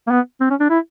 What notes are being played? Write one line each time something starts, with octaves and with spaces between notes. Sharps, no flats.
A#3
B3
C4
C#4
D4
E4